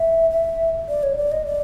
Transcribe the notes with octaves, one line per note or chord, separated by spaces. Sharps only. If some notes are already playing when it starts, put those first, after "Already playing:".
Already playing: E5
E5
D5
C#5
D5
D#5
D5